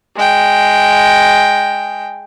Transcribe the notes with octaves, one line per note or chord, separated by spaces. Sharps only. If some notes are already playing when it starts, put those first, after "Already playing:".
G#3 G5